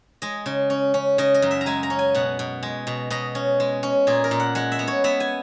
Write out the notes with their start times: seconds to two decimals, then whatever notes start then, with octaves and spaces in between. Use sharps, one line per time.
0.22 G#3 D#5
0.46 C#3
0.70 C#4
0.94 C#4
1.18 C#3 D#5
1.34 D#5
1.42 F#2
1.51 E5
1.61 A#5
1.66 G#3 G#5
1.83 A#5
1.90 C#4
1.99 G#5
2.15 B2 F#5
2.39 B2
2.63 G#3
2.87 B2
3.10 B2 D#5
3.35 C#4
3.60 G#3
3.83 C#4
4.07 A#2 G#4
4.24 A#4
4.31 A#2
4.40 F#5
4.55 G#3 F#5
4.72 E5
4.79 B3
4.88 C#5
5.04 B3 E5
5.20 G#5